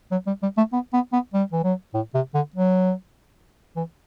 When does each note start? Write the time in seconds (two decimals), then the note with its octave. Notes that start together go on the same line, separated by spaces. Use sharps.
0.12 F#3
0.27 G3
0.43 G3
0.57 A3
0.73 B3
0.93 B3
1.13 B3
1.34 G3
1.52 E3
1.64 F#3
1.94 A2
2.14 C3
2.35 D3
2.56 F#3
3.76 E3